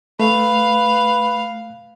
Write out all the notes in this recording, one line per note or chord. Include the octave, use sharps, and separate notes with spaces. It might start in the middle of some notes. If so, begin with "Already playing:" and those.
A3 B4 F5